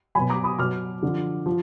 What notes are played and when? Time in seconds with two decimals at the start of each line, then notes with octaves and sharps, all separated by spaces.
0.15 B2 F#3 G#5 B5
0.29 A#5 D6
0.44 B5 D#6
0.58 B2 F#3 D6 F6
1.03 D3 F3
1.46 F3